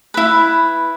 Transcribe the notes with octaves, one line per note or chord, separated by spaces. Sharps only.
E4 B4